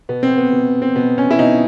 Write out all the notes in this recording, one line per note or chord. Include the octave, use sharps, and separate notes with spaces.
B2 B3
C4
B3
B2
C4
B2 B3
C#4
E4
B2 D#4